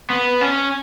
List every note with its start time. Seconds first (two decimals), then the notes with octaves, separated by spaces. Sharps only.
0.10 B3
0.41 C#4